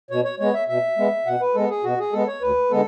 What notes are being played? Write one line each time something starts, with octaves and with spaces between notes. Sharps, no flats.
B2 C#5
C#5
G#3 B3 C#5
E5
B2 E5
G#3 B3
B2 F#5
B4
G#3 B3 A4
G#4
B2 F#4
G#4
G#3 B3 A4
C#5
D2 B4
D3 G#3 B3 A4